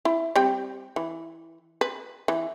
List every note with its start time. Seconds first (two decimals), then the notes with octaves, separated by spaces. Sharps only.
0.05 E4
0.35 G3 C4 G5
0.96 E3
1.81 B4
2.28 E3